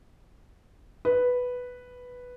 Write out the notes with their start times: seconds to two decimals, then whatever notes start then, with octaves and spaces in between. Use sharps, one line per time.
1.05 B4